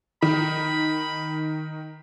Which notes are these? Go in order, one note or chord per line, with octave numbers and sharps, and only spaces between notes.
D#3 B5